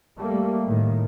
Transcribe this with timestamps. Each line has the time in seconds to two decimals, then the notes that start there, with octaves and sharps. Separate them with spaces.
0.16 G3 A3 A#3
0.66 A2 D#3